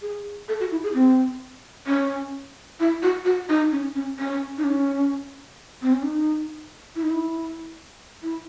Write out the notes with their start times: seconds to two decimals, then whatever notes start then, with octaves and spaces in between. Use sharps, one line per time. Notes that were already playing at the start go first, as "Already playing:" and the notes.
0.02 G#4
0.48 A4
0.60 F#4
0.71 E4
0.83 G#4
0.94 C4
1.87 C#4
2.80 E4
3.03 F#4
3.25 F#4
3.49 D#4
3.72 C#4
3.95 C#4
4.19 C#4
4.58 D#4
4.64 C#4
5.82 C4
5.93 C#4
6.03 D#4
6.96 E4
7.03 D#4
7.10 E4
8.23 E4